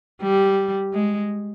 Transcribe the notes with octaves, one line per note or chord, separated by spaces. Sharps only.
G3
G#3